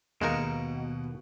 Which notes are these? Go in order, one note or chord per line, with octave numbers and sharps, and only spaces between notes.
D#2 B2 G#3 D#4 A#4 F5 C#6